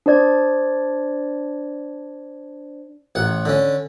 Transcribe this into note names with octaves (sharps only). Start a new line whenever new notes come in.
D4 C5 D5 G#6
A1 F#5
D3 C#4